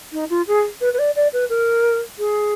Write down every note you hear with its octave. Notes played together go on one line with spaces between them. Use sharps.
D#4
F4
G#4
B4
B4
D5
D5
B4
A#4
G#4